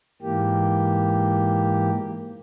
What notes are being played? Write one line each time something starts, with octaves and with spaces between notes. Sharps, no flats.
G#2 E3 A#3 G4